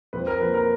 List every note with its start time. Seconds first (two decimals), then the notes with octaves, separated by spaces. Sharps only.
0.13 F2 B4
0.27 A#4
0.41 F3 A#3 B4
0.54 A#4